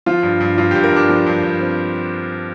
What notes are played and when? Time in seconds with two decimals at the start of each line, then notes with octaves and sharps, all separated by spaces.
0.06 F3 F4
0.23 G2
0.40 G2
0.58 G2 F4
0.71 G2 G4
0.84 A#4
0.92 G2 D4
1.09 F3
1.26 G2
1.43 G2
1.60 C4